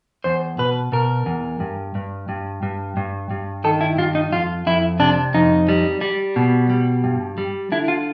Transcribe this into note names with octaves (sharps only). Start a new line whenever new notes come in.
E2 C5
B2 B4
B2 A#4
E2
G2
G2
G2
G2
G2
G2
D#3 A4
E4
G2 F4
D#4
F2 F4
F2 E4
C3 D4
F2 D#4
G3
G3
B2
G3
G2
G3
D3 E4
F4